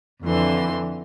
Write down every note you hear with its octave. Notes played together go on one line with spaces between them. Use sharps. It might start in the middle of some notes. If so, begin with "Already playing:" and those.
F2 D3 E3 C6